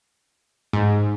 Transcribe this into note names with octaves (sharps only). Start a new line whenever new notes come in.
G#2